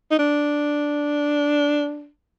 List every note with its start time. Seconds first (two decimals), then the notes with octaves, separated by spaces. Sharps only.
0.11 D#4
0.19 D4